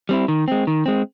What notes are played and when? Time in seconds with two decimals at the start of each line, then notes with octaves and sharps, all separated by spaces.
0.09 G3 C4 E4
0.28 D#3
0.48 G#3 C4
0.67 D#3
0.86 G#3 C4